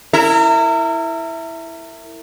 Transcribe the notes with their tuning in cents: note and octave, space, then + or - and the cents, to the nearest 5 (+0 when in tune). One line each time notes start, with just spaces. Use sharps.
E4 +0 A#4 -35 E5 +0